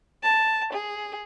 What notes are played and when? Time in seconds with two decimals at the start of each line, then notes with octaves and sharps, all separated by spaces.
0.23 A5
0.73 G#4